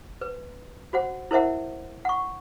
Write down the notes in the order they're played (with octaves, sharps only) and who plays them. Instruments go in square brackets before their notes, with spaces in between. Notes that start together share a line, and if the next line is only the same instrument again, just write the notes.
[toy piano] B4
F#4 C5 F#5
E4 A#4 C5 E5 F#5
F#5 C#6